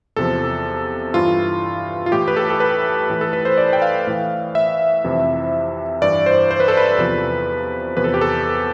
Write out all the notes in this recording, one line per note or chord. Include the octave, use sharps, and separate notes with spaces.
E2 C3 F3 A4
G2 E3 F4
F4
A2 E3 G4
B4
A4
A4
B4
A2 E3
A4
B4
C5
D5
G5
F5
A2 E3
E5
F2 C3 E3
G2 E3 D5
C5
C5
B4
A4
B4
E2 C3 F3
E2 C3 F3 B4
A4
G4
A4